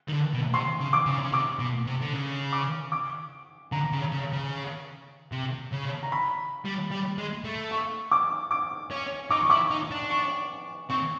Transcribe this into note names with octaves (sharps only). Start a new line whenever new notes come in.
D#3
D3
B2
C3 C6
C#3
D6
C#3
C#3
C3 D6
B2
C3
D3
C#3
D6
D6
D3 A#5
C#3
C#3
C#3
C3
C#3
A#5
B5
G3
G3
G#3
A3
C#6
D6
D6
C#4
D#4 D6
C#6
E4 D6
D#4
D4
C#6
C4 C#6